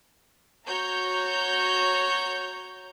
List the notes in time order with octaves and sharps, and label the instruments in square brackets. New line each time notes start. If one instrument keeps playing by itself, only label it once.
[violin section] F#4 C#5 A#5 G6